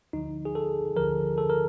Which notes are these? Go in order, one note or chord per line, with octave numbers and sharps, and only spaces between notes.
D2 D3 F3 D#4
G#4
A4
D2 D3 F3 A#4
A4
A#4